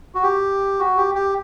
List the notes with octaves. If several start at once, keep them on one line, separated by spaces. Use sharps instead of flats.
F#4
G4
F#4
G4
G4